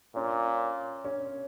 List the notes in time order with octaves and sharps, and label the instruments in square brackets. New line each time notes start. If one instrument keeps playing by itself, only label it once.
[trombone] A#2 [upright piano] C#4
[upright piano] C#4